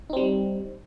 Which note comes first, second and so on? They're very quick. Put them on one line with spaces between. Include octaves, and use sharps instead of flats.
D#4 C4 G3